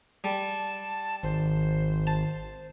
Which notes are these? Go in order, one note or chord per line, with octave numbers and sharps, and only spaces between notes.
G3 A5
G#1 C5
A5